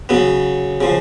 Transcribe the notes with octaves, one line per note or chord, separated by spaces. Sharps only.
C#3 F#3 B3
C#3 F3